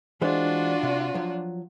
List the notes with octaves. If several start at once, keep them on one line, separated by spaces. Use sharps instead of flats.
E3 G#3 D4 F4 F#4 C5
C3
F3 F#3